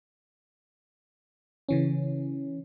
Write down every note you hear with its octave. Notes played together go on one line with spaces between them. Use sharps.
C#3 E3 C#4